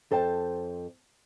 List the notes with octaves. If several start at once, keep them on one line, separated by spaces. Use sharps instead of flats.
F2 A4 C5 G5 A5